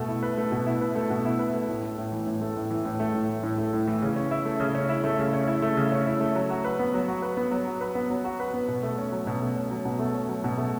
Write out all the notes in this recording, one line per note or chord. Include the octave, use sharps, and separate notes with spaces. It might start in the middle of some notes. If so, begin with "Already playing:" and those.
Already playing: B2 A3
E4
B4
A3
B2
E4
B4
A3
B2
E4
B4
A3
A2
A3
A2
E3
A2
A3
A2
E3
A2
A3
A2
E3
A2
A3
A2
E3
C#3
C#4
E4
A3
C#3
C#4
E4
A3
C#3
C#4
E4
A3
C#3
C#4
E4
A3
F#3
F#4
B4
B3
F#3
F#4
B4
B3
F#3
F#4
B4
B3
F#3
F#4
B4
B3
B2
A3
C#4
F#3
B2
A3
C#4
F#3
B2
A3
C#4
F#3
B2
A3